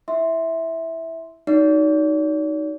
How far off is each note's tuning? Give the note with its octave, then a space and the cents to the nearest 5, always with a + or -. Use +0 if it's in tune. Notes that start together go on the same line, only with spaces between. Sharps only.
E4 +0 E5 -10 C6 -5
D#4 +0 F#4 +0 D5 -45